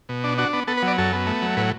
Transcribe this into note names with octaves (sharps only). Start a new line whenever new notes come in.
B2
D4
D4 F#4
B3
B3 A4
B4
F#3 D5
F#2 A4
B3
A3
F#3
A2 B4